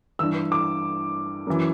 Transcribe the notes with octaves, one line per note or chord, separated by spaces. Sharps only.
G2 E3 E6
D6
F#2 E3